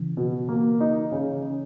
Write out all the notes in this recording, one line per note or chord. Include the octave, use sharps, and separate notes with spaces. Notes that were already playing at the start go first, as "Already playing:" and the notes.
Already playing: C#3 E3
B2
A#3
D#4
C#3